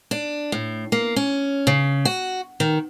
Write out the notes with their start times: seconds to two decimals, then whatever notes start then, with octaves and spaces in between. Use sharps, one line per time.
0.11 D4
0.52 A2
0.92 A#3
1.16 C#4
1.67 C#3
2.05 F#4
2.60 D#3